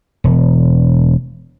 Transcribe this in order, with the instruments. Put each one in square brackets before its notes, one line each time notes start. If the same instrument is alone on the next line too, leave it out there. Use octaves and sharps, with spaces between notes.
[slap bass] E1